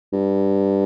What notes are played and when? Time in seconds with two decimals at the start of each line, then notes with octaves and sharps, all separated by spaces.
0.13 G2